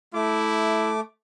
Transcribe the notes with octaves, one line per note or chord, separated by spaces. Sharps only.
A3 E4 D6